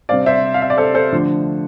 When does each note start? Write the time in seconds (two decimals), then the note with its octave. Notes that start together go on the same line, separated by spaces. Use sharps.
0.09 C3 G3 C4 D5 F5
0.26 C5 E5
0.54 F5
0.62 E5
0.70 D5
0.77 A4 C5
0.95 A4 C5
1.12 D3 F3 A3 D4